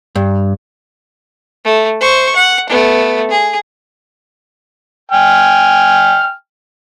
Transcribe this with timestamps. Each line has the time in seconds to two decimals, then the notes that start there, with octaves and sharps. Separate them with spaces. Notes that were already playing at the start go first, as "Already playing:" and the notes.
0.15 G2
1.65 A3
2.00 C5 C#6
2.36 F#5
2.69 A3 B3
3.31 G#4
5.12 G5 G#5 F6